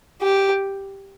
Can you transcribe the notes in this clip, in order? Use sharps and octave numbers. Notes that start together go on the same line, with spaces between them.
G4